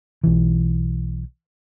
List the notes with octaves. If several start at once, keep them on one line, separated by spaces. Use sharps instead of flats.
B1 E3